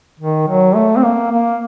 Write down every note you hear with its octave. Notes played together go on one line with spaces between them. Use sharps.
D#3
F#3
A3
C4
A#3
A#3